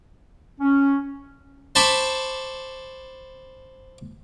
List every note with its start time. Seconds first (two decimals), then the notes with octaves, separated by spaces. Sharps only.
0.60 C#4
1.75 C5 A5 B5 C#6 D6